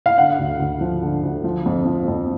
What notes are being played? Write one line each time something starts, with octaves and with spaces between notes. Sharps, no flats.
F5
D3 F#5
D2
D2
F3
D3
D2
F3
F2
F3
F2